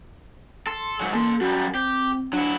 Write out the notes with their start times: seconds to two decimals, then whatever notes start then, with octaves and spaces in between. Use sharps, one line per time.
0.67 A4 C6
1.00 G#2 F#3
1.14 A#3 A4 C6
1.41 F#2 G3 F#4
1.75 C4 G4
2.33 F#3 D4 E4